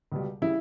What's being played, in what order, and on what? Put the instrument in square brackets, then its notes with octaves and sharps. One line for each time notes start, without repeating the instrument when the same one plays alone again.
[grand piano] C#2 B2 G3
C#3 G3 E4